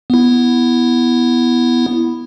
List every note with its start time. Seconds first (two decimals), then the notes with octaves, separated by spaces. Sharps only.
0.10 B3 E4